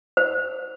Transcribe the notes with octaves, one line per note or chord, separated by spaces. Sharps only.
C5